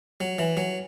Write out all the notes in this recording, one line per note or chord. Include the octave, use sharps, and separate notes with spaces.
F#3
E3
F#3